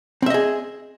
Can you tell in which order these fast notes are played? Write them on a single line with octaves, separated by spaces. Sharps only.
C4 E5 D#5 G#4